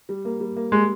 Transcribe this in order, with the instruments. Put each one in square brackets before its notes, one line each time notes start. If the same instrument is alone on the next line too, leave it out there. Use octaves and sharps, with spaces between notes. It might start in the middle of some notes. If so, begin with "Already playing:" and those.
[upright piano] G3
A#3
G3
A#3
[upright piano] G3 [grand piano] G#3